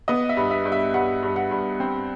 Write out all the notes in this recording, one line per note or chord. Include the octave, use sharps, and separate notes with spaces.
B3 D#5
E5
G2
E5
G2
E5
G2 F#5
G2
F#5
G2
C4